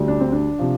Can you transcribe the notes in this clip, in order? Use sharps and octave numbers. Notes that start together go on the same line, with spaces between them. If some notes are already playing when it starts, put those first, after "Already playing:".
Already playing: D2 D3 G3
D4
C4
D4
C3 F3